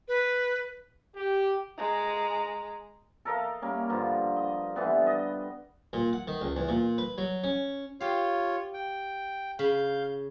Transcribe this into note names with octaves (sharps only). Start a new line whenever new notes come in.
B4
G4
G#3 A#5
A4 A#4 D#5 F5
G3 A#3 C#4
G2 D3 F3
D#5
D3 E3 G3 B3
D#5
A#2
F#5
D#3
C#2
E2
A#2
B4
F#3
C#4
F4 G4 C#5 F5
G5
C#3 F5 B5 G6